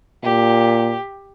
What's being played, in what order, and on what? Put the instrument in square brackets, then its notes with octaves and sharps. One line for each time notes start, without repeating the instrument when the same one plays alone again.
[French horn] A#2 [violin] G4